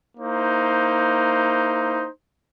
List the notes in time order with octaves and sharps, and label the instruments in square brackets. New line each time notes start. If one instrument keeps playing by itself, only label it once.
[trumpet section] A#3 D#4 E4 C5